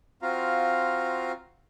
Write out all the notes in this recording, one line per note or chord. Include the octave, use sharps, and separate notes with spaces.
C4 F4 F#4 F5 A#5